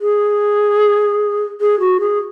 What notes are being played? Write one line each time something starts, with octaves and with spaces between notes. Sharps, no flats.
G#4
G#4
F#4
G#4